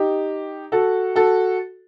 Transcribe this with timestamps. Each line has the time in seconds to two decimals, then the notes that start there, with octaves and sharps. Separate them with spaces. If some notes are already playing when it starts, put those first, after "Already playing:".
Already playing: D#4 G4
0.72 F#4 A4
1.16 F#4 A4